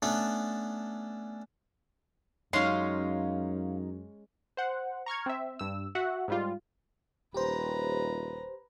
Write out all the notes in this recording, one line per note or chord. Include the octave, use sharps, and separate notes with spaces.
A3 B3 C#4 D4 A4
F#2 F#3 G#3 C#4 D#4 G4 F5 C6
C5 F#5
A#5 C#6 F6 G#6
C4 E5
G2 E6
F#4 E5 F#5
G#2 G3 F4
D#1 G4 B4 C5 A#5